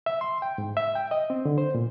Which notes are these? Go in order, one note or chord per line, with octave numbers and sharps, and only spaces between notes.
E5
C6
G5
G#2
E5
G5
D#5
C4
D3
C5
A#2